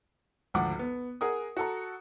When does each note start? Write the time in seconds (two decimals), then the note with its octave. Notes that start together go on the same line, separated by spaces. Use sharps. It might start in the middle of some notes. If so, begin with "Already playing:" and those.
0.54 G#1 D2 F3 F#5 D6
0.79 B3
1.21 G#4 A#4 F#5 D#6
1.57 F#4 A4 A#5